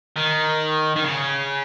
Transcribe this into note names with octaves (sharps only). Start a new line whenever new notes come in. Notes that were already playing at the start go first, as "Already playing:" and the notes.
D#3
D#3
C#3